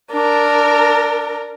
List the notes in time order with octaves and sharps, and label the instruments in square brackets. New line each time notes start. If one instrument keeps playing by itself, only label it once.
[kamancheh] D4 A#4